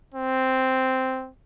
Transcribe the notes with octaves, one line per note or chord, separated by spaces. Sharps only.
C4